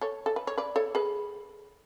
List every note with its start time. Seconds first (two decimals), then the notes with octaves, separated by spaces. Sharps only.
0.01 A4 C#5
0.26 A4
0.36 B4
0.47 C#5
0.58 B4 D5
0.76 A4 C#5
0.95 G#4 B4